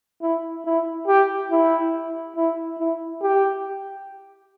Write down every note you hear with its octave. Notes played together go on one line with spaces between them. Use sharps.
E4
E4
G4
E4
E4
E4
G4